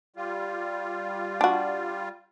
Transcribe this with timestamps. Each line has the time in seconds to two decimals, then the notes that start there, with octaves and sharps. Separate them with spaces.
0.16 G3 F4
1.41 D4 F#4